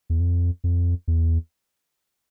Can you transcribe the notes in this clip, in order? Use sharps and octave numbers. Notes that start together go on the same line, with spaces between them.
E2
F2
F2
E2